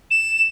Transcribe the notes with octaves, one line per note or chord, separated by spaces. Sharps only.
E7